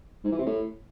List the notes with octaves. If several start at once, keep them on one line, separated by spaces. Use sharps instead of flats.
G#2
E3
C3
A2